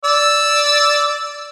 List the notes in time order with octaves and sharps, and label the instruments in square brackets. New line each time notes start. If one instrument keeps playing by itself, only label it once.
[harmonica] D5 E6